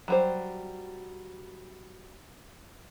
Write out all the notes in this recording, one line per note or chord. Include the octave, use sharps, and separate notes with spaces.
F#3 G3 C5